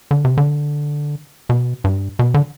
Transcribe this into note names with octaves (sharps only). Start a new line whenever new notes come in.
D3
C3
D3
B2
G2
B2
D3